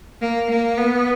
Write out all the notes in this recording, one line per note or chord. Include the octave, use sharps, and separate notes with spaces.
A#3
A#3
B3